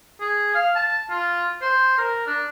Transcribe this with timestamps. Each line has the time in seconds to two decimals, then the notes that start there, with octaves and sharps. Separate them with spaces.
0.20 G#4
0.54 F5
0.75 A5
1.10 F4
1.62 C5
1.98 A#4
2.26 D4